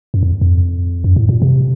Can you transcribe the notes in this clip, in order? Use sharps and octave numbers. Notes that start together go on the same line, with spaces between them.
F#2
F2
F2
F#2
A2
A#2
C3